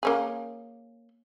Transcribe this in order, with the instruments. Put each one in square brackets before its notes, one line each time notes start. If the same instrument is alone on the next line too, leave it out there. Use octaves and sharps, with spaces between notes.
[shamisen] A#3 C#4 G#4